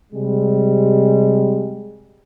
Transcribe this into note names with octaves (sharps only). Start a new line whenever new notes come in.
C3 G3 G#3